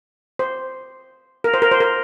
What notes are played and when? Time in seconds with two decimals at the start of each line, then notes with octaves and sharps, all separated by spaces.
0.39 C5
1.44 A#4
1.54 C5
1.62 A#4
1.71 C5
1.80 A#4